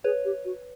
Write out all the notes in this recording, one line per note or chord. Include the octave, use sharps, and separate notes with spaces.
G#4 B4 C#5
G4
F#4